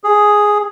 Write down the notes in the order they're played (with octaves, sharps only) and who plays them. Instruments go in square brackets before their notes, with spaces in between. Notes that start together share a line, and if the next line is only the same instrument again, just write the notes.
[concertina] G#4